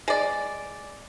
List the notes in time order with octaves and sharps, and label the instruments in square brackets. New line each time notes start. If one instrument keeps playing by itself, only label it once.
[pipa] G#3 D5